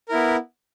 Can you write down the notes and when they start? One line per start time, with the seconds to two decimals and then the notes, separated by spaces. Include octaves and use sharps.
0.09 A#4
0.11 E4
0.14 B3